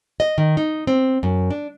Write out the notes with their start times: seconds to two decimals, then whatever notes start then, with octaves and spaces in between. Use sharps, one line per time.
0.20 D#5
0.38 D#3
0.57 D#4
0.87 C4
1.23 F#2
1.51 D4